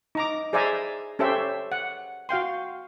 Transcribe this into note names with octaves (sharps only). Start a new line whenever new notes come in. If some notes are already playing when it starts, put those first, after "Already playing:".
D#4 A#5 D6
G#4 C5 D5 E5 G#5 A#5
C#4 G4 A4 C5 E5 G5
F#5
F#4 F5 G5 C6